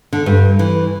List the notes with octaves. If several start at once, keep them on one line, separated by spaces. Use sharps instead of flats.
D3
G2
E3